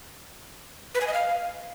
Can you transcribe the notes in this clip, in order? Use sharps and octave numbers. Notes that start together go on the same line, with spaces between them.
B4
G#5
D#5
F5